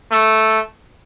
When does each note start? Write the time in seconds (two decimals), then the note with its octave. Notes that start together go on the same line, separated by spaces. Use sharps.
0.12 A3